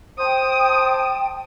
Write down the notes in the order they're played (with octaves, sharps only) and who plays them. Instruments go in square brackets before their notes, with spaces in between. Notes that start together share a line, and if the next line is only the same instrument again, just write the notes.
[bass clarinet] C5 [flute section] G5 A5 [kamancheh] D#6